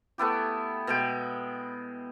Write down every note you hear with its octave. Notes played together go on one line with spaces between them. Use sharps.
A3 B3 E4 G4
B2 G#3 G5